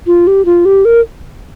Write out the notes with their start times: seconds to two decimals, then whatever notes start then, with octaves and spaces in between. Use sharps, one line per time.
0.07 F4
0.27 G4
0.45 F4
0.65 G4
0.85 A#4